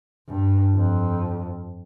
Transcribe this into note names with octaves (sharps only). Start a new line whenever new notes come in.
G2
F2